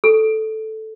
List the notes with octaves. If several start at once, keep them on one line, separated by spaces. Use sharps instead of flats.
A4